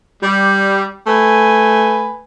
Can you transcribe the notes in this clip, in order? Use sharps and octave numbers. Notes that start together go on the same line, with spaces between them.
G3
A3 B4 G#5